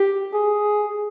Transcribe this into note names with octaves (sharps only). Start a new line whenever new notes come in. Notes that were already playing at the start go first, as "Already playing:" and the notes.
Already playing: G4
G#4